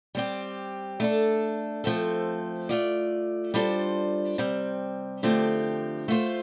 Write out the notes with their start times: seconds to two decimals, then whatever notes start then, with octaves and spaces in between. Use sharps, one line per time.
0.15 G3 C4 G4
1.00 A3 D4 A4
1.84 F3 A3 C4 A4
2.69 A3 F4 D5
3.54 G3 D4 F4 A4 C5
4.38 C3 G3 C4
5.23 D3 F3 A3 C4 G4
6.08 A3 F4 C5